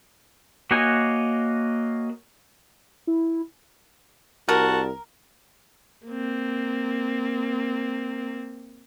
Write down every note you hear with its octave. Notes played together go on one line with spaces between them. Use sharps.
A#3 F#4 C#5 D#5 G#5
E4
C2 F#4 A#4 A5
A#3 C4